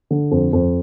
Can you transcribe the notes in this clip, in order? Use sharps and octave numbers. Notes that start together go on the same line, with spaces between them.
D3
F2
F2